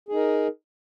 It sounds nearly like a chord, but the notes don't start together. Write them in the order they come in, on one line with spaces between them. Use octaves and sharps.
G#4 D#4 A#4